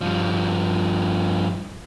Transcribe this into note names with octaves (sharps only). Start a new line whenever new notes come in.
G2 F3